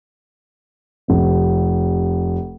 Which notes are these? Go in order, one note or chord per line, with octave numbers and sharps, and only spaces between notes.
F1 C3